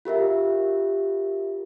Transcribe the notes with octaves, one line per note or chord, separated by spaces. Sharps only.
F4 G4 A#4 E5